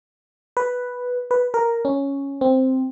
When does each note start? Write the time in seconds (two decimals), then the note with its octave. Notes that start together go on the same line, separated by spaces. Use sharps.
0.57 B4
1.31 B4
1.54 A#4
1.85 C#4
2.41 C4